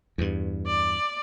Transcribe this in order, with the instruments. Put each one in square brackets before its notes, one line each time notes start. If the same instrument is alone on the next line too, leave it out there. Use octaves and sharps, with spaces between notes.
[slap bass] E2 G2
[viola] D5